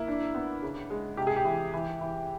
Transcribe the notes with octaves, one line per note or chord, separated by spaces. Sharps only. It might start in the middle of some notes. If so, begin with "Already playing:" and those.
Already playing: A#3 E4
D4
B3
C#3
G#3
C3 G4
G#4
G4
E3
E3
E3